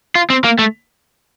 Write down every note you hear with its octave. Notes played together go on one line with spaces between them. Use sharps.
F4
C4
A#3
A3